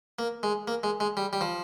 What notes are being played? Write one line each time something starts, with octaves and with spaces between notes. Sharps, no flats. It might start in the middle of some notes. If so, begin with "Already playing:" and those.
A#3
G#3
A#3
G#3
G#3
G3
G3
F3